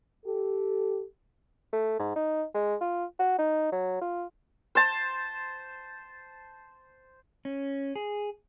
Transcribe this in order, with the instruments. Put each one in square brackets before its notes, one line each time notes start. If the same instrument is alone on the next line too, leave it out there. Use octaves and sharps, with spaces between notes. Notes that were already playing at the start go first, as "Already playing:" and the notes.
[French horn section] G4 A4
[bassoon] A3
G#2
D#4
G#3
F4
F#4
D#4
F#3
F4
[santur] C5 A5
[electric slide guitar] C#4
G#4